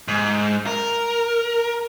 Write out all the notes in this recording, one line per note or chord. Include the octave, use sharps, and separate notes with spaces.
G#2
A#4